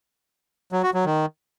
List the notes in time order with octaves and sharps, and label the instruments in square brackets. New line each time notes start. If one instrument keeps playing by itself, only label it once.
[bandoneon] F#3
F#4
F#3
D#3